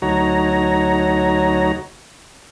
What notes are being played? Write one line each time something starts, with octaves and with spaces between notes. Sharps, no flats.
D2 F#3 D#4 F#4 C#5 A#5